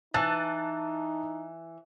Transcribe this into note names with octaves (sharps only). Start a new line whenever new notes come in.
E3 D#4 A5 F#6 A6